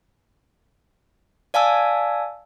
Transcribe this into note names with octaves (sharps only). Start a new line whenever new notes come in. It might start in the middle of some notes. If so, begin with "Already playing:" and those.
D5 F5 G#5 A5 E6